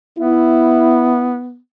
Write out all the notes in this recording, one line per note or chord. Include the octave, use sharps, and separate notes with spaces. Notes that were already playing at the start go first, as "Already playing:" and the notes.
B3 E4